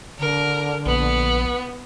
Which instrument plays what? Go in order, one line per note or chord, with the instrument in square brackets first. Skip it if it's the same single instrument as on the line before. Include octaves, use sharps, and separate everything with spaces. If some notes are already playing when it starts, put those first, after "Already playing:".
[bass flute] D3 [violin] A#4
[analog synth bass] A#1 [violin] B3